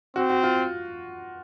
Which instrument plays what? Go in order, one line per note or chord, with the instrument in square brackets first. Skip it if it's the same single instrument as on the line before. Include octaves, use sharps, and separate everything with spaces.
[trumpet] C4 [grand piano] F#4
[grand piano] F#4
F4